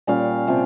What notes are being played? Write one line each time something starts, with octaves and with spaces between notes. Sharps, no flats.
A#2 G3 C#4 F5
C3 F3 C4